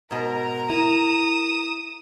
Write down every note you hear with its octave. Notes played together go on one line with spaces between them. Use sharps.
G#2 B2 A#4 A#5
E4 A#4 D#6 E7